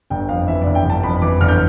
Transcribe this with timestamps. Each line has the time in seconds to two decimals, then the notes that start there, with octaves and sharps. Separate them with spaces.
0.10 G1 G5
0.29 F2 F5
0.48 E3 E5
0.62 G1 D5
0.75 G5
0.85 G1 A5
1.03 F2 B5
1.22 E3 D6
1.41 G1 F6
1.48 G6